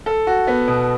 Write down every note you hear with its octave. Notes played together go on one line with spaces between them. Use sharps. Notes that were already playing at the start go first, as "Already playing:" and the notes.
A4
F#4
B3
B2